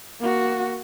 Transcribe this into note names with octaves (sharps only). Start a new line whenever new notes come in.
A#3 F#4